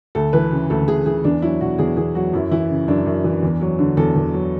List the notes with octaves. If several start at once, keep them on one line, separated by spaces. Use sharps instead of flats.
D2 A4
E3 B4
C#3
D2 A4
D2 G#4
E3 G#4
E2 D4
F#3 E4
B2 F#4
E2 G#4
E2 G#4
F#3 F#4
F#2 E4
E3 E4
C#3
F#2 D4
F#2
E3
E2
F#3
D3
E2 A4
E2
F#3